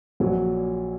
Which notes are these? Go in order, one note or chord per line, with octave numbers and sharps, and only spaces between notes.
A#1 A#2 F#3